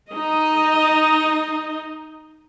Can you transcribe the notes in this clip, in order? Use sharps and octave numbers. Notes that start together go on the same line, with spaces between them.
D#4 D#5